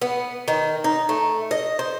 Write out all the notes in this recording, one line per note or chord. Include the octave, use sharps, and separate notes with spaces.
B3
D#3
D#4
A3
D#5
C5